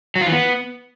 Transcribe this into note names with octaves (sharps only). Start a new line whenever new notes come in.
F#3
F4
E3
B3